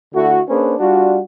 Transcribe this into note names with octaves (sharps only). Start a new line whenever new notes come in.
D3 A3 E4 F#4
A#3 C#4 D4 G#4 B4 C5
G3 D4 F4 F#4